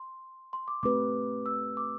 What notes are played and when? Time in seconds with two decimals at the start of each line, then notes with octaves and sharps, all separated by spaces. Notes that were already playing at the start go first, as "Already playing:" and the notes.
Already playing: C6
0.53 C6
0.68 D6
0.83 A3 C4 G4 B4 D6
1.46 E6
1.77 D6